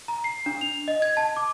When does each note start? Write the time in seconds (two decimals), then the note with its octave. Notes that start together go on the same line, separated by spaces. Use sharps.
0.08 A#5
0.24 C7
0.46 D4
0.61 F7
0.88 D#5
1.02 G#6
1.17 A5
1.37 D6